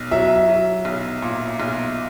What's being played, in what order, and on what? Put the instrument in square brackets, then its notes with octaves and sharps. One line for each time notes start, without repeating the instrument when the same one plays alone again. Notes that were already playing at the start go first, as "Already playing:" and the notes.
Already playing: [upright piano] B1
[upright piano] F#3 [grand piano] E5
[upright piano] F#3
B1
A#2
B1